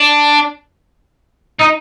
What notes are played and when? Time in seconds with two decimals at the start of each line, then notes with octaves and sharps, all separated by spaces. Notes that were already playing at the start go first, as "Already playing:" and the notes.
Already playing: D4
1.59 D#4